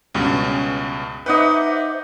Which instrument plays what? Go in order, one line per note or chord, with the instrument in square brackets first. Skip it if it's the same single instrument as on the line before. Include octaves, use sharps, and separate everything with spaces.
[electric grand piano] C#2 G2 B2 [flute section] C#4
[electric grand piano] D#4 B4 [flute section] C5 E5 D6 [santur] D#5 F#5 G5